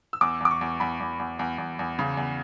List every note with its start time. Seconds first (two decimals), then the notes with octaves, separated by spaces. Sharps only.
0.13 E6
0.21 E2 D6
0.40 E2 D6
0.51 C#6
0.61 E2
0.80 E2 B5
1.00 E2
1.19 E2
1.39 E2
1.58 E2
1.79 E2
1.99 C#3
2.17 E2